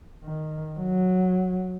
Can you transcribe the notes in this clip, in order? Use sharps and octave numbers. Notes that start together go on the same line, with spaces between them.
D#3
F#3